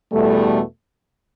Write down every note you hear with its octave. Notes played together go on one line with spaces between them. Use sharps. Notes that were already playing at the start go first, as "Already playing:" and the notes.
E2 B2 G3 A3